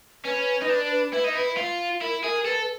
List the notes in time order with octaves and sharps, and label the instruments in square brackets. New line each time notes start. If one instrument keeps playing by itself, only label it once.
[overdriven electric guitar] C#4 [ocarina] B4
[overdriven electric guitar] D#4
D4
E4
D#4
E4
F4
[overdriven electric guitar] E4 [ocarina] A#4
[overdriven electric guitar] G#4 [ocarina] A#4
[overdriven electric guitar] A4 [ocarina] B4